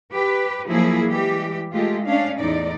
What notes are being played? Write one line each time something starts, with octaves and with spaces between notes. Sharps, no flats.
G4 B4
F3 F#3 A#3 E4 G#4
E3 G3 G#3 G4
G#3 A3 F4 G4
C#4 D4 F5
E2 A2 D#4 D5